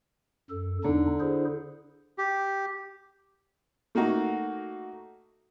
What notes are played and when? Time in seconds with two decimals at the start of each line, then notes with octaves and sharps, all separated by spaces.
0.50 F#2 A4
0.85 E2 D3 D4 D#4
1.20 E4 G#4 C5
2.18 G4
3.95 A3 A#3 D#4 F#4